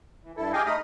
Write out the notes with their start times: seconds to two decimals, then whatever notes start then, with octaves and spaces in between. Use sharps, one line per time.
0.23 E3
0.37 G2 E4 A4
0.53 G4 G#4 D#5 F5 G5 G#5
0.66 A3 D#4 D#5 B5 D#6 F6